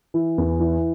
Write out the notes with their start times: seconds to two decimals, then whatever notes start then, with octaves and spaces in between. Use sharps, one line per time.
0.14 E3
0.38 E2
0.60 E3